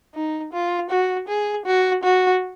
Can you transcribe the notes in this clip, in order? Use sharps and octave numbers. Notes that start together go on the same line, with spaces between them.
D#4
F4
F#4
G#4
F#4
F#4